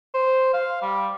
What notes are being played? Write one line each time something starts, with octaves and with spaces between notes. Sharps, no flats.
C5
F5
G3